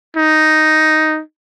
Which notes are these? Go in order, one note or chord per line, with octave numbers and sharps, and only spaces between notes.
D#4